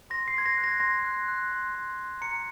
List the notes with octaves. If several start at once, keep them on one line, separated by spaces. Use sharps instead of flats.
C6 A#6
C7
C6 G#6
A#6
F#6
A#6
C6 A#6
F#6
F#6
C6
C6
F#6
A#5 C#7